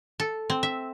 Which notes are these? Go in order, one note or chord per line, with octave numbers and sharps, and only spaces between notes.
A4
C4
E5